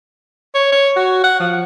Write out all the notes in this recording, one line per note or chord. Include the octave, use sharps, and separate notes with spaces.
C#5
C#5
F#4
F#5
F3